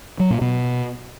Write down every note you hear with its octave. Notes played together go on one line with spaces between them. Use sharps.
F#3
A#2
B2